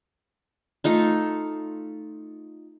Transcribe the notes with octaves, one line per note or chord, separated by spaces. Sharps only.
A3 D#4 F4